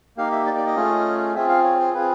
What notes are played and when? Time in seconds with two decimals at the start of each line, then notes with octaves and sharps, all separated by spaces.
0.17 A#3 D#4 G4 F5
0.32 E5
0.46 D5
0.57 D5
0.67 D#5
0.76 A3 C#4 F4 G#4
1.35 C4 F4 G#4 E5
1.49 F5
1.64 C#5
1.80 C5
1.93 C4 F4 G#4 B4